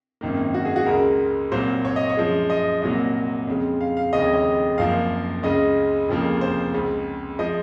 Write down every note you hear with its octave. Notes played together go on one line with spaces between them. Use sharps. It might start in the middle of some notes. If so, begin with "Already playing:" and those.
G#1 F#2 D#3 A#3
F#4
G#4
F#4
C#2 C#3 G#3 A#4
C2 A#2 F#3 A#3 C5
C#5
D#5
C#5
F#2 F3 G#3
D#5
C2 A#2 F#3 A#3 D#5
F2 C#3 G#3
F5
F5
F1 D#2 C#3 G#3 D#5
C#5
D#5
F#1 F#2 F3 A#3 F5
C#2 C#3 G#3 D#5
F1 F2 C#3 F3 A#3
C5
C#2 C#3 G#3
F3 G#3 D#5